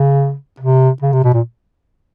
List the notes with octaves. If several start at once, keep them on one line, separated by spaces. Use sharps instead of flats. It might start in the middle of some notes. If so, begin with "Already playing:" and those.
Already playing: C#3
C3
C#3
C3
B2
A#2